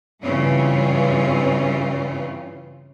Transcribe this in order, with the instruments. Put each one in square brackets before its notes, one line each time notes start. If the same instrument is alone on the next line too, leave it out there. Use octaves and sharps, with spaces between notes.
[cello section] G2 C#3 E3 C4 C#4 F4